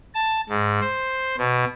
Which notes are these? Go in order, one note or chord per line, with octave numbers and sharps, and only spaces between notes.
A5
G#2
C5
B2